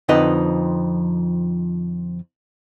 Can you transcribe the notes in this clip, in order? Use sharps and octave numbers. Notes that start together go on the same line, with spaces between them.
F2 D3 F3 D#4 B4 D#5